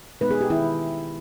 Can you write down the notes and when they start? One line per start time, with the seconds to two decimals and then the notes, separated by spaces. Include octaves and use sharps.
0.20 B2 G#3 B3 D#4 B4
0.31 G#4
0.41 G4
0.50 D#3 E4